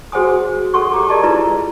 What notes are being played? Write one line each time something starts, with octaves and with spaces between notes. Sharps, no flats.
F#4 G#4 C5 F#5 G#5 D#6
A4 F#5 C6 C#6
G4 A#5 D6
G#4 A#4 D5 D#5 A5
E4 F4 B4 A#5